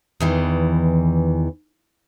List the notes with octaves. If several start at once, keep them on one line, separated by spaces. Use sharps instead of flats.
E2 D#3 E3